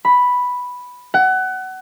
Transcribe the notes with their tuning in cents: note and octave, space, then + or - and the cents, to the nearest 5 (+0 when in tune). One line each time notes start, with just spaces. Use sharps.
B5 +0
F#5 +25